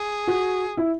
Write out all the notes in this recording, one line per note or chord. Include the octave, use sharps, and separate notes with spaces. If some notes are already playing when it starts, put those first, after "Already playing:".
Already playing: G#4
F#4
E4